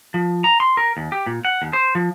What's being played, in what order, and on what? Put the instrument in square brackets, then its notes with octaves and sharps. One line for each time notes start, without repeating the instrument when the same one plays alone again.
[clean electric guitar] F3
A#5
C6
A#4
D#2
G4
A#2
F#5
D#2
C5
F3